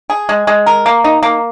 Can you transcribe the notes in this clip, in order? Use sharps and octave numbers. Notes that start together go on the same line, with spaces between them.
G#4
G#3
G#3
A#4
A#3
D#4
A#3